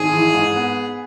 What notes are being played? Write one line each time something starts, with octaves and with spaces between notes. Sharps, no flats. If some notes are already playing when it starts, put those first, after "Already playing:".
Already playing: G#1 G#4
E3
G#2
B3